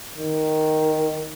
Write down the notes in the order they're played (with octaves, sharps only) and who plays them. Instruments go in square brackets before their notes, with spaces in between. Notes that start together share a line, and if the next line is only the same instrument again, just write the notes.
[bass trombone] D#3